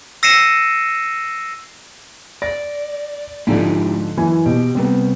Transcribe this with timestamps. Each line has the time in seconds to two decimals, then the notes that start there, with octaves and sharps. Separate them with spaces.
0.23 E6 A#6 C7 C#7 D#7 E7
2.42 D5 A#6
3.47 G#2 D3 F3 G#3 E4 G4
4.17 F#2 E3 G#5
4.46 B2 G4
4.75 C3 G3 B3 C4